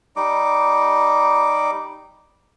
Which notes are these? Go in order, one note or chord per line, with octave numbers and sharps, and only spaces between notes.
G3 D#4 D6